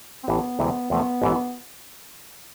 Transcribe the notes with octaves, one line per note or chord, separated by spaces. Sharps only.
C4
A1 A2 E3 B3
D2 C3 E3 G#3 C4
E2 C3 F3 A3 B3
A1 G#2 E3